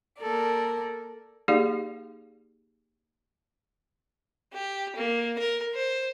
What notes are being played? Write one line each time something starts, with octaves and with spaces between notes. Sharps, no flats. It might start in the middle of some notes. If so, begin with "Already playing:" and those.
A#3 A4 A#4 D5
A#3 D#4 G4 G#4 D5 F5
G4
A#3
A#4
C5